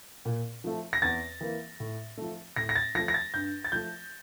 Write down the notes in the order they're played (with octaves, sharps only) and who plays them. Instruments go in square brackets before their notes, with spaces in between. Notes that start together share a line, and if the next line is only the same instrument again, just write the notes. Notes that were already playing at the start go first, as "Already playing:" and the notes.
[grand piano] A#2
F3 A3
A#6
E2 A6
E3 A#3
A2
F3 A3
A2 A#6
A#6
A6
F3 A3 A#6
A#6
A6
G2 G6
A6
F3 A3 G6